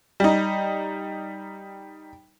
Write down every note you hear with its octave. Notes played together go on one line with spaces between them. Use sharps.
G3 D#4